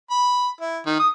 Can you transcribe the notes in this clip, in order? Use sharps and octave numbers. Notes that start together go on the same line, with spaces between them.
B5
E4
D#3
D#6